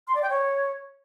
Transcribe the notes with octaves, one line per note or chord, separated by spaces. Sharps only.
C6
D5
G5
C#5